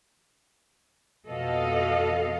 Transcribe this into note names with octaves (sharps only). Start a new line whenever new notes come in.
F2 B2 A4 D#5 F5